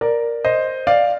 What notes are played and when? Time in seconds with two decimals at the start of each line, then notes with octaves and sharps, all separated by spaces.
0.01 A#4 D5
0.45 C5 D#5
0.87 D5 F5